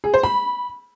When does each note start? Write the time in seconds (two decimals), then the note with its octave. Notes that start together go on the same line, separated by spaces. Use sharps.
0.04 G#4
0.14 C5
0.23 B5